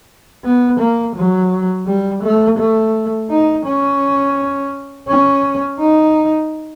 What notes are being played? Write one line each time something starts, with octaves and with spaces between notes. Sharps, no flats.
B3
A#3
F#3
G3
A3
A3
D#4
C#4
C#4
D#4